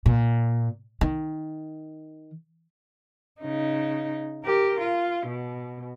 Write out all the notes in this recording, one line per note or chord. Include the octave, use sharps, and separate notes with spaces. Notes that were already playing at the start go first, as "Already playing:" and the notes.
A#2
D#3
C#3 D#4
G4 A#4
F4
B2